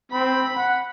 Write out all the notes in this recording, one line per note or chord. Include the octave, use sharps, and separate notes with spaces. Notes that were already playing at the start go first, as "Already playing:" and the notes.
C4 B5
F#5